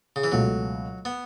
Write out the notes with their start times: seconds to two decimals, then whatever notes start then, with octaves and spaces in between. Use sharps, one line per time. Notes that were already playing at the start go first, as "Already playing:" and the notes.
0.16 C#3
0.24 E3
0.32 C#2 B2 F#3 A3
1.05 B3